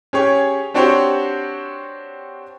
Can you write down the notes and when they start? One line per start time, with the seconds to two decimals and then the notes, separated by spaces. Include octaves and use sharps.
0.13 C#4 G4 G#4 C#5
0.74 C4 D4 F#4 G4 C5 C#5